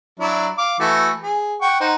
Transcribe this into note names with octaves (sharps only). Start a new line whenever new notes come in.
F#3 D4 E4
F5 D6
E3 A3 F#4
G#4
F#5 G5 C#6
D#4 C5 F#5